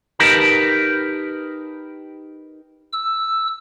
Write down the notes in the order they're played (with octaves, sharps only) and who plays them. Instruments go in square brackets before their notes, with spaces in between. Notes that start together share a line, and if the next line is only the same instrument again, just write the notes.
[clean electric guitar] D#4 G4 A#4 B4 A5 A#5
[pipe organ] E6